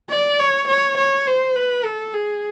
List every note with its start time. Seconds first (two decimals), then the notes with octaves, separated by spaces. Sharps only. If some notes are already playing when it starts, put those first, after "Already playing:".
0.10 D5
0.40 C#5
0.68 C#5
0.98 C#5
1.27 C5
1.56 B4
1.84 A4
2.14 G#4